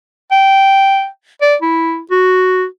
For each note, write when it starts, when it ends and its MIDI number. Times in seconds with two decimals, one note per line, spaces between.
0.32 1.07 79
1.41 1.56 74
1.62 2.00 64
2.11 2.65 66